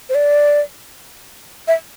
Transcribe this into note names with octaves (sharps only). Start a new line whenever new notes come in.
C5
D5
E5